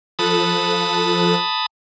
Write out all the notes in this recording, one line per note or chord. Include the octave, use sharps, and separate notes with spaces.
F3 A4 A5 B5 D#6 F#6